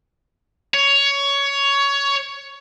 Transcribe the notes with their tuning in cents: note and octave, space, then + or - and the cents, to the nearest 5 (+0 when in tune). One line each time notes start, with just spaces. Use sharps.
C#5 +15